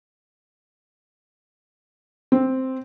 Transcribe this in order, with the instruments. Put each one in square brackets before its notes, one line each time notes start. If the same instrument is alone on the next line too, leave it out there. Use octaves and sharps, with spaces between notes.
[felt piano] C4